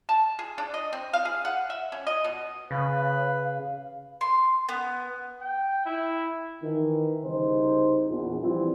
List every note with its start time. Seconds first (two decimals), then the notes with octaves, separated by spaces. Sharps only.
0.09 A5
0.39 G#4
0.58 D4
0.74 D#5
0.93 C4
1.13 F5
1.25 G#4
1.45 F#5
1.70 E5
1.92 C#4
2.07 D#5
2.24 B2
2.71 C#3 B4 F5
4.21 C6
4.69 B3
5.41 G5
5.86 E4
6.62 D#3 E3
7.23 C2 C#3 D#4 C5
8.08 A#1 E2
8.40 E3 F3 G3 C4 E4 F4